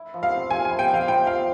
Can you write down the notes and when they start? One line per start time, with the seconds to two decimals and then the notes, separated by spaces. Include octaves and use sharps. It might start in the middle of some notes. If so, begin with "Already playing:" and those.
Already playing: E4
0.14 F3
0.23 F5
0.31 C4
0.51 F3 G#5
0.65 G#5
0.70 E4
0.79 G5
0.88 F3
0.94 F5
1.08 E4 G5
1.27 F3 F5